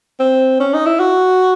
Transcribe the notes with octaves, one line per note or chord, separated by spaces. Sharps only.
C4
C#4
D#4
E4
F#4